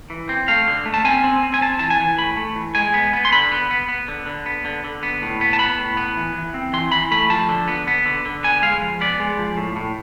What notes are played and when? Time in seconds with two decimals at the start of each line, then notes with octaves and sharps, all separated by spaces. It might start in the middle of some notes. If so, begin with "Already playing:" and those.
0.10 E3
0.29 C4
0.48 A3 F5
0.67 D3
0.86 A3
0.94 A5
1.04 C4 G#5
1.24 C4
1.43 C4
1.54 G#5
1.61 C4 A5
1.79 E3 A5
1.90 G#5
2.00 E3
2.18 A2 B5
2.37 A3
2.56 E3
2.75 G#3 G#5
2.94 B3
3.13 B3
3.25 C6
3.32 D3 B5
3.52 B3
3.71 B3
3.88 B3
4.08 D3
4.26 D3
4.46 B3
4.65 D3
4.84 D3
5.03 B3
5.22 A2
5.41 B3
5.53 A5
5.59 B3 B5
5.78 A2
5.97 B3
6.17 E3
6.35 E3
6.54 C4
6.73 E3 C6
6.92 E3 B5
7.11 A3 B5
7.30 F3 A5
7.49 D3
7.68 B3
7.88 B3
8.05 D3
8.25 D3
8.43 B3 G#5
8.62 G#3 F5
8.82 F3
9.01 B3 D5
9.20 G#3
9.39 F3
9.57 A2
9.76 A2